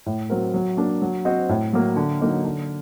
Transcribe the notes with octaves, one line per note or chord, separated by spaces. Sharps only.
A2
F#3 C4 F#4 A#4
F#3
A#3 D4
F#3
C4 F#4 C5 D#5
A2
F#3 A#3
D3
F#3 A#3 D#4
D3